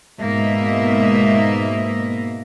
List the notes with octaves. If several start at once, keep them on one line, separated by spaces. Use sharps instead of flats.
G#2 B2 A#3 D#5 E5